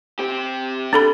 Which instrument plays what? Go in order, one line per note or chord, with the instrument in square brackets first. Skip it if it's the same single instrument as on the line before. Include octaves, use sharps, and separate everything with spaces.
[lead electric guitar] C4 G4
[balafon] D4 A4 B5